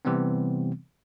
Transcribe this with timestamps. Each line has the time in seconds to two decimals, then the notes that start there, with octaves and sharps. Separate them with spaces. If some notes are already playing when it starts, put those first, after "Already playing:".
0.05 C3 E3 G3 B3 C4